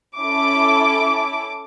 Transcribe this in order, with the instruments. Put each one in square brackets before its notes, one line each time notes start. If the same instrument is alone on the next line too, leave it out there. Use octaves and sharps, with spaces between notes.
[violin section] C#4 E4 A4 D6